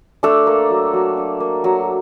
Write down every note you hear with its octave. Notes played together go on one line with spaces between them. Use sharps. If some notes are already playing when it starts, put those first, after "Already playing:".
A3 D4 A4
A#3
F#3
F#3
D4
A#3
F#3